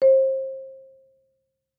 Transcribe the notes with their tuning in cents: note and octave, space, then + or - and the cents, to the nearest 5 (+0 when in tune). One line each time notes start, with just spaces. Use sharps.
C5 +30